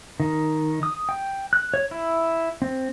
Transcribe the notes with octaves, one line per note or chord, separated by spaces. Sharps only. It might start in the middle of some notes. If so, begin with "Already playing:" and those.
D#3
D#6
G5
F#6
C#5
E4
C4